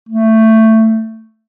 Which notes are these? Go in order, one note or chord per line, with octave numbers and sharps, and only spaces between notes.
A3